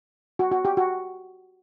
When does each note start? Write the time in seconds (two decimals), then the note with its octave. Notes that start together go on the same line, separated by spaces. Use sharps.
0.39 F#4
0.52 F#4
0.65 G4
0.77 F#4